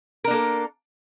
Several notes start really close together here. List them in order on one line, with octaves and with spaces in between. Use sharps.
A#4 D4 A#3 A4